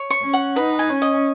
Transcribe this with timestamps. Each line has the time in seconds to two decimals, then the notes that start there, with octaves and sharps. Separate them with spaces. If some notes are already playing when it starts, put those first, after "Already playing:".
Already playing: C#5
0.10 C#6
0.22 C#4
0.33 F#5
0.56 D#4 B4
0.79 G#5
0.90 C#4
1.02 D#5